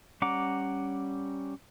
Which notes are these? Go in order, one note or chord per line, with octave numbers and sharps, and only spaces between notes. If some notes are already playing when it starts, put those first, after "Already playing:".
G3 C#4 F#5 A#5 D6